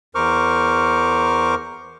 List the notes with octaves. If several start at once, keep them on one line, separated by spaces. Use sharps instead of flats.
E2 A#4 C5 C#6 D6 F6